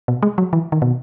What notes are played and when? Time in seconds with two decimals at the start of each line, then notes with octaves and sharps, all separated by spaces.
0.08 B2
0.23 G#3
0.38 F#3
0.53 E3
0.72 D#3
0.82 B2